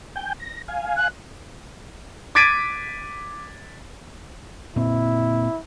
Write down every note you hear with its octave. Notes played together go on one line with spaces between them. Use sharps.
G5 G#5 G6
A#6
F5 G#5
F#6
D6 G#6 A6 B6 D7 D#7
A#2 C4 E4